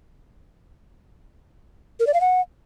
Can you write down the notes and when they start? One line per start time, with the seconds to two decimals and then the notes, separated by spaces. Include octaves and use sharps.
2.00 A#4
2.07 D5
2.14 F5
2.21 F#5